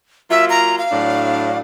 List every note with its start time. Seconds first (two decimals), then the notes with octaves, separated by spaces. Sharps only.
0.31 F#3 A#3 F4 E5
0.50 A#5
0.78 F5
0.92 A2 F#3 D4